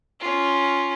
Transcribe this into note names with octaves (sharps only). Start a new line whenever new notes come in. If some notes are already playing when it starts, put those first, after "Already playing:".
C#4 F4